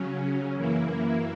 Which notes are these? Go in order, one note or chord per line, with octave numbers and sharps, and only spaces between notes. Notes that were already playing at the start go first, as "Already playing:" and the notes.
Already playing: C#3 F#3 C#4
F#2 E3 A#3 E4